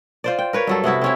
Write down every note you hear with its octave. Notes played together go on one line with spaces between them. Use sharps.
F4 C5 D5
G5
A#4 B4 C#5
G2 F#3 A4
C3 B3 E4 F#4
C4 C#4 E4